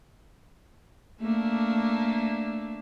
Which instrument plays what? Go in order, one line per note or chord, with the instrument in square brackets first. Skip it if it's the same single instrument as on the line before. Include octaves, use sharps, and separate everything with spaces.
[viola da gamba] A3 A#3 D4